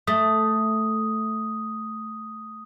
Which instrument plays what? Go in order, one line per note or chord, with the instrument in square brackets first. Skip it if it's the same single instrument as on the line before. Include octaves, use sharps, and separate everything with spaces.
[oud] A3 [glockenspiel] D#6